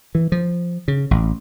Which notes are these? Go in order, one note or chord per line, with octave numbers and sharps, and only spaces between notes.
E3
F3
C#3
A1